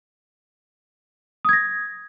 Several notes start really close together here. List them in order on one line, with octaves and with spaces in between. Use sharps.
D#6 G#6 A#6